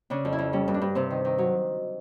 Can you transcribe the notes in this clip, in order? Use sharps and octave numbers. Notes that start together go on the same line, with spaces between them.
C#3 D4
F2
E4
F2
G3 C#4
G2
D4
G2
C3 C4
D#3
D#3
F#3